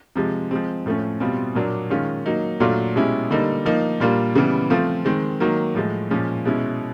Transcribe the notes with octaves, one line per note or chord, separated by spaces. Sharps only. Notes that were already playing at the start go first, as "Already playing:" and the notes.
C3 F3 G#3
F3 G#3 C4
A2 F3 A3 C#4
B2 G3 C4 F4
A#2 F#3 A#3 D4
D#3 G#3 C#4 F4
F#3 A#3 D#4
A#2 F#3 A3 D4 F4
B2 G#3 C#4 E4 G4
D3 G3 A#3 D#4
F3 A#3 D#4
A#2 G3 A#3 D4 F4
C#3 E3 G3 B3
F3 A3 C4 F4
D#3 G#3 C4
D#3 F#3 A#3
A2 F3 G#3
A#2 F3 G#3 C#4
B2 G#3 C#4 E4